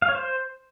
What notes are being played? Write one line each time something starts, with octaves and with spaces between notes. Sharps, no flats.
F5
C#5
C5